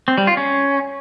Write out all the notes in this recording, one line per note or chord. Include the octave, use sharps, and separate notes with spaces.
C4
G3
F4
C#4